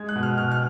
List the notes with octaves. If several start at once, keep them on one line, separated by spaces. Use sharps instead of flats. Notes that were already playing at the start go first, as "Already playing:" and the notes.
Already playing: G#3 G#6
F#6
B2
F6
B2 F6
F6